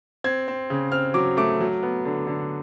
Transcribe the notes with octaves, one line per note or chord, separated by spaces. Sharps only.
C4 G#6
C4
C#3
C4 F6
F#3 D6
A3 D6
F#3
B3
D3
D3